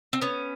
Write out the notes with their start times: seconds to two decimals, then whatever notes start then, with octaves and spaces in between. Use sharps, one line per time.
0.13 C4
0.22 B3 C#4